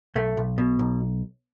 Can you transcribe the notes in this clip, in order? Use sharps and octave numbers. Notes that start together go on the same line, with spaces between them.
B1 A3
B1
B2
B1